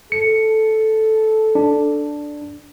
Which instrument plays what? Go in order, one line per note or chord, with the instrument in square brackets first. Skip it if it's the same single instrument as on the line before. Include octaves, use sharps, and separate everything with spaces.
[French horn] A4 [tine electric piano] C#7
[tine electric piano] D4